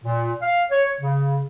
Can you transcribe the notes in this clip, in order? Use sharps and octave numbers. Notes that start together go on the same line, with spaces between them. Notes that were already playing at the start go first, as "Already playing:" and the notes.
A#2
F5
C#5
C#3